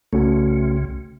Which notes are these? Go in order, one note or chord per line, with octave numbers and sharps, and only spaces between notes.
C2 C#3 A3 C#4 F#4